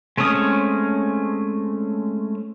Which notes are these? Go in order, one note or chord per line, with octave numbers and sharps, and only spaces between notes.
G#3 A3 C4 C#4 D#6